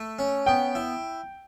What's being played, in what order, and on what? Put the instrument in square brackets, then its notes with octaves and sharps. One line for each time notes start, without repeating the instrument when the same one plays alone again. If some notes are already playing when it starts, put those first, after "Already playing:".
Already playing: [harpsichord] A3
C#4
[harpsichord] B3 [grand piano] G5
[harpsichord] E4